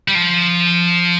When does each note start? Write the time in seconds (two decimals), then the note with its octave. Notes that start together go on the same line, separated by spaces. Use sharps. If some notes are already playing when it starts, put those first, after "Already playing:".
0.08 G3
0.15 F3